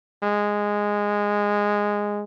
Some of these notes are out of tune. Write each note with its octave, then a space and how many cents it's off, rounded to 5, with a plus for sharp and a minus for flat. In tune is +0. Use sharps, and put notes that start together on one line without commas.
G#3 -10